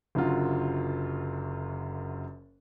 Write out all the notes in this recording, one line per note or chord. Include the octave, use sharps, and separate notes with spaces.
F#1 F#2 D3 F4 F#4